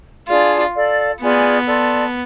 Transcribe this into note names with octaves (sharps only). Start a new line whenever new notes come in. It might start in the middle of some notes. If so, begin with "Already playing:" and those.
D4 F4 G#4 D5 F5
A4 D5 F5
B3 F4 G#4 D5 G#5
A4 D5 A5 C6